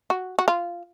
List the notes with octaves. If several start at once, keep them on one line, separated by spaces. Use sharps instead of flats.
F#4
F#4
F4